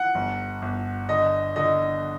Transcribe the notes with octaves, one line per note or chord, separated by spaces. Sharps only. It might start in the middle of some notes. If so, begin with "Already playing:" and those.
Already playing: F#5
G1
G1
D3 D#5
D3 D#5